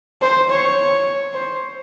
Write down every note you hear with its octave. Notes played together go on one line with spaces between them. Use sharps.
C5
C#5
C5